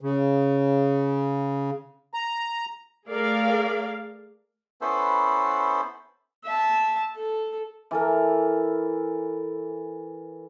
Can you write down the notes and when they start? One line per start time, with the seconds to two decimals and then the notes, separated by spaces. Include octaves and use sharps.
0.01 C#3
2.14 A#5
3.08 A3 G#4 A#4 D5 F5
4.81 B3 C#4 E4 A4 B4 C5
6.45 E5 A5
7.16 A4
7.91 E3 A4 A#4